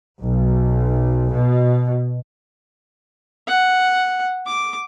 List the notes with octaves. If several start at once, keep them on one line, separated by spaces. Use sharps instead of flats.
B1
B2
F#5
D6